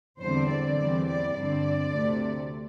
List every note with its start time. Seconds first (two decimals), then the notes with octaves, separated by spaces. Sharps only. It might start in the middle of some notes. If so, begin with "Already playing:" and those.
0.21 E2 D3 G3 C4 C5
0.51 D5
0.78 E2 E3 G3 C4
1.07 D5
1.36 G2 D3 C4 D5
1.92 D2 C3 A3